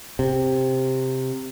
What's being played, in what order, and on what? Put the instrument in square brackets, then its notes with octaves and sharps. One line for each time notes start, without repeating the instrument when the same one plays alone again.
[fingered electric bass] C3